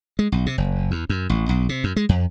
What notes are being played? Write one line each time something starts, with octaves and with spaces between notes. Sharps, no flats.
G#3
B1
C3
F#1
E2
F#2
A1
B1
C3
F#2
G#3
F2